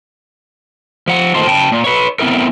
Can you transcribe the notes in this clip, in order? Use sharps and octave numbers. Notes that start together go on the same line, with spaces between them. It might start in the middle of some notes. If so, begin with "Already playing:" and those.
F3 F#5
D#3 A3 A#3 C4 F4 C5
C#3 G5 A5
A#2
B4 C#5
B3 C4 E4 A#4